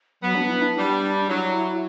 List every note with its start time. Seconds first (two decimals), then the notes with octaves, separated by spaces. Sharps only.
0.21 F#3 B3
0.36 D4
0.49 E4
0.61 D4
0.75 G3
1.28 F#3 E4